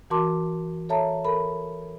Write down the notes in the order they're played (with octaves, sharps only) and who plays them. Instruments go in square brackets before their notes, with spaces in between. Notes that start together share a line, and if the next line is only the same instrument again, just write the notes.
[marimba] E3 F#4 A#4 A5 C6 D6
A4 C#5 E5 A5 A#5
A4 A#4 B5